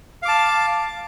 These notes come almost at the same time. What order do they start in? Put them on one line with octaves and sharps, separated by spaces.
F5 D6 A5